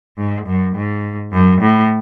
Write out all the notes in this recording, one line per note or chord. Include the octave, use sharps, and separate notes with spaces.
G#2
F#2
G#2
F#2
A2